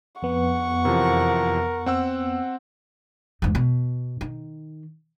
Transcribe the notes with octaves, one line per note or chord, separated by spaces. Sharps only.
F2 B3 F#5 C#6
C3 E3 F3 A#4
C4 F#5 E6
E2 G#2
B2
D#3